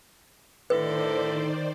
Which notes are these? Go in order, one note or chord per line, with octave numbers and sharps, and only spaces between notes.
A2 D3 D#3 A4 B4 C5 D5